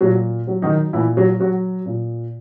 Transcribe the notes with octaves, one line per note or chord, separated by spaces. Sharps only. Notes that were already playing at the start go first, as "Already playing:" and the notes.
A#2 F#3 F#4
F#3
D#3 D#4
A#2 E3 E4
F#3 F#4
F#3 F#4
A#2